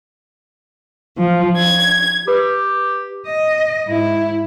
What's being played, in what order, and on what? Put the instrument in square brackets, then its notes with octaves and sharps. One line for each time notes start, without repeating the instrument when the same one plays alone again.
[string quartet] F3
G#6
[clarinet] G4 [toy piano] B4 B5 D#6
[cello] D#5
G#2 E4